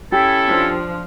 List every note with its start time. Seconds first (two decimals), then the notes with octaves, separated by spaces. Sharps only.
0.12 C#4 E4 G4 A4
0.47 F3 D4